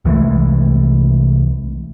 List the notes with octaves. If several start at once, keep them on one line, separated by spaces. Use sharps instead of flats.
C2 E3 G#3 A3